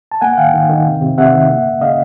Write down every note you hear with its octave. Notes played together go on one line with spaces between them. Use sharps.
A5
A#3 F#5 G#5
F#5
D#3 F5 G5
D#3
D#3
C3
C3
C3 E5 F#5
D#3
A#3
C#3
C#3 D#5 F5